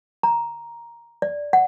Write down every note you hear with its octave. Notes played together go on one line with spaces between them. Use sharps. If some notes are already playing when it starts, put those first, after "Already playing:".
A#5
D5
F#5